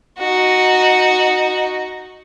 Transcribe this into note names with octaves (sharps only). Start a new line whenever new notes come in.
D#4 F#4